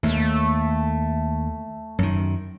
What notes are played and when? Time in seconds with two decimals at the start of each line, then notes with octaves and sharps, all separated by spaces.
0.03 D#2 A3
1.99 F#2 D#3